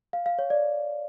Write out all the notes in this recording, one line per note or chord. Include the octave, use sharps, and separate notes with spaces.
F5
F5
C#5
D5